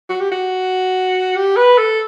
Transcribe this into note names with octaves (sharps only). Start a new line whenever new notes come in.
F#4
G4
F#4
G4
B4
A4